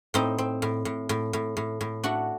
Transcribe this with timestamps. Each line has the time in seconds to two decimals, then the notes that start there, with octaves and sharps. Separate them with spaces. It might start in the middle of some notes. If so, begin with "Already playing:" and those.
0.14 A2 C4 D#4
0.38 C4
0.62 A2
0.85 A2
1.09 A2
1.33 A2
1.57 A2
1.81 A2
2.04 A3 D4 F#4